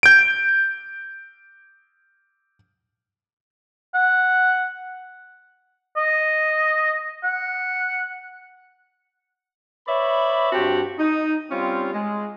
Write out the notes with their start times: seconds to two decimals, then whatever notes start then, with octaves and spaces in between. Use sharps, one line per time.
0.03 G6 D7
3.94 F#5
5.97 D#5
7.24 F#5
9.87 B4 C#5 D5 E5 B5
10.53 G2 C4 F#4 G4 A5
10.98 D#4
11.51 G3 C4 C#4 F4
11.93 G#3